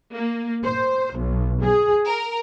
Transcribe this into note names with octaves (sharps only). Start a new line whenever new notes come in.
A#3
C5
B1
G#4
A#4